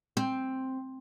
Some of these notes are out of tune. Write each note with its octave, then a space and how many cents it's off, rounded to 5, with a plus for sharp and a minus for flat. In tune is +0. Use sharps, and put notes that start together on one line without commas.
C4 +5